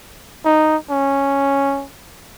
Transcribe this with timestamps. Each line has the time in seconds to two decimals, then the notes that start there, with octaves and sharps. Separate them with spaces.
0.45 D#4
0.90 C#4